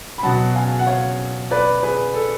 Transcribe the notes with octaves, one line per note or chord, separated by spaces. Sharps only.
B5
B2 F#3 F#5 A5
F5 G#5
F#5
C#5 F5
B4 D5
G#4 B4
A4